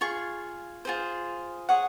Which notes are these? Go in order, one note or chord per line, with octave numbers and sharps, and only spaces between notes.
F4 G#4 C#6
F4 G#4 C5
G#4 C#5 F#5